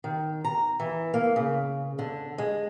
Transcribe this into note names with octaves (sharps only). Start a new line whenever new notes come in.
D#3
A#5
E3
A#3
C#3
D3
G#3